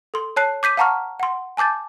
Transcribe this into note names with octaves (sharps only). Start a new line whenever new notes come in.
A4 C6
C#5 A5 F#6 C7
D6 G6 B6 D#7
F5 F#5 A5 A#5 C#6 F6
F#5 C6
G#5 A5 D6 G6 A6